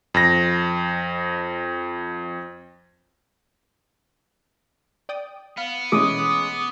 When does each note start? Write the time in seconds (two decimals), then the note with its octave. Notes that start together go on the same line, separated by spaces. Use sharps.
0.14 F2 A#6
5.09 D5 G5 D#6
5.58 B3 F5
5.92 B2 E3 G#3 A3 C#4 D6 D#6